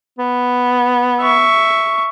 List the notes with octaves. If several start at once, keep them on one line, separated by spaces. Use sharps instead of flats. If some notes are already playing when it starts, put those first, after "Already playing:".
B3
E5 C#6